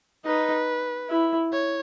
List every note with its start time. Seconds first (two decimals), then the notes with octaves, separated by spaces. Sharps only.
0.25 D#4 B4
1.09 E4
1.52 C#5